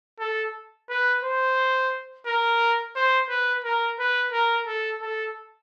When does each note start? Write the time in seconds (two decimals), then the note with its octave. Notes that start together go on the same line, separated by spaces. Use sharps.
0.20 A4
0.89 B4
1.24 C5
2.27 A#4
2.95 C5
3.29 B4
3.65 A#4
3.99 B4
4.33 A#4
4.67 A4
5.02 A4